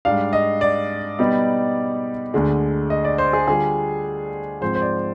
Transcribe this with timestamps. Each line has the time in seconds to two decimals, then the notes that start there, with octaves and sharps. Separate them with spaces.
0.05 G#2 G3 D4 F5
0.33 D#5
0.61 D5
1.19 B2 G3 B3 D#4
2.34 D2 D3 G#3
2.90 D#5
3.05 D5
3.18 C5
3.33 G#4
3.47 D3 G3 D4 F4 G#4
4.61 G#2 F3 C4 C5
4.75 C5
4.81 D5